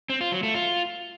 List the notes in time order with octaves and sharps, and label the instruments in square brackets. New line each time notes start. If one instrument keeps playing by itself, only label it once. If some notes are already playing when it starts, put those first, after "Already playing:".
[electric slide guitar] C4
F4
F#3
A3
F4